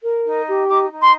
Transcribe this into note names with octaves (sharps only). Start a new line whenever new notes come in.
A#4
D#4
G4
D#4 D6
D#4
C6